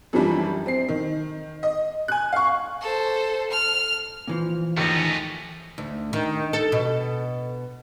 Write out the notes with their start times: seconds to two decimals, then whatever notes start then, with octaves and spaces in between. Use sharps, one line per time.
0.13 F#2 E3 F3 G3 D4
0.66 C4 C7
0.89 D#3
1.63 D#5
2.08 G#5 F#6
2.32 F5 C#6
2.81 A4 C5
3.50 F6
4.27 A#2 E3 F3
4.77 D#2 A3 C#4 D#5
5.78 D2
6.13 D#3
6.53 A4
6.72 B2